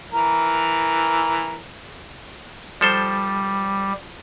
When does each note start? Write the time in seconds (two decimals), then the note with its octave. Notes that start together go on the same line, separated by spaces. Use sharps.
0.12 E3 A#4
2.81 F3 G3 A4 C5